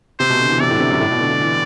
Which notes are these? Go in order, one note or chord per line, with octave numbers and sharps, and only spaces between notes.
C3 C5
B2
D3
E3
C3 D5
A2 D3
C3
F#2
A2
B2
D3
D3
E3